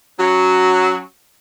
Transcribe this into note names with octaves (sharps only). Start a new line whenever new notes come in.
F#3 C#4 F#4